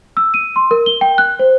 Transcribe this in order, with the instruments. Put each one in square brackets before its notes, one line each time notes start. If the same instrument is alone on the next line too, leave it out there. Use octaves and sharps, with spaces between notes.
[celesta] E6
D#7
C6
A#4
G7
G5
F#6
C5